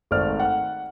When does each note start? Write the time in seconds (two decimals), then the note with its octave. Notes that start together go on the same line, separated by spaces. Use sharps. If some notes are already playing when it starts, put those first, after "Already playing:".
0.11 G#1 A3 D5 F6
0.40 F#5